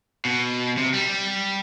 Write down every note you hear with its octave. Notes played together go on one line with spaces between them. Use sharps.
B2
C3
G3